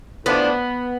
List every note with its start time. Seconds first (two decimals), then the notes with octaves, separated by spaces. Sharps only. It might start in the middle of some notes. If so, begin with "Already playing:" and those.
0.25 A2 F3 A3 B3 D4